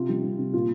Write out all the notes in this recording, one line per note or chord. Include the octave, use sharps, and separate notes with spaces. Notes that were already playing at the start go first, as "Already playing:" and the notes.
Already playing: C3 F4
G3
C3
C3
A#2 F4